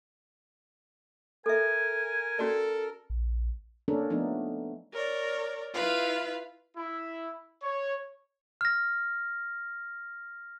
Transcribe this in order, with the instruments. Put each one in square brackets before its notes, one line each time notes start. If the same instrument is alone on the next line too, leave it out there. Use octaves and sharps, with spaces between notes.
[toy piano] A4 E5 [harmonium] A#4 [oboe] G#5
[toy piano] C#4 F#4 D5 [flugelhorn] A4
[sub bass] A#1
[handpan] A#3 C#4 D4 A4 A#4
F3 A3 B3 D4 D#4
[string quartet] A#4 C#5 D5
E4 F4 B4 F5
[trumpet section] E4
C#5
[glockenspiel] F6 A#6